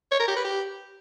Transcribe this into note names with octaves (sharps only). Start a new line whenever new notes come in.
C#5
A#4
G4
B4
G4